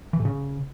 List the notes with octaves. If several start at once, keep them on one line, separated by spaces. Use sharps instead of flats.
E3
A2
C#3